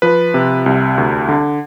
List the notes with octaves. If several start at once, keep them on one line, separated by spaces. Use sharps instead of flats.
F3 B4
C3
C2
D2
D3